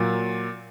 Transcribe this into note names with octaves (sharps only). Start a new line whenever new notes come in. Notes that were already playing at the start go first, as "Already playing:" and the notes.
Already playing: A#2 F#3